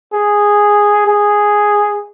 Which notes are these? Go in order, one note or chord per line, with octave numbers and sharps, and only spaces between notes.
G#4
G#4